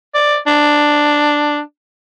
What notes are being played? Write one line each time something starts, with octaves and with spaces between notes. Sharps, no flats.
D5
D4